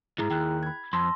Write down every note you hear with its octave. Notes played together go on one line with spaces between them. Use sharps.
D2 G#2 E4 G#4 A#5
D#2 G5 F#6
B5 G#6
F2 A5 C6 E6 A#6